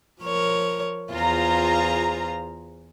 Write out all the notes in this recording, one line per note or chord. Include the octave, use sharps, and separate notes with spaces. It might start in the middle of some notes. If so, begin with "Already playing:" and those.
F3 A#4 C#5
E2 F4 G#4 C5 A#5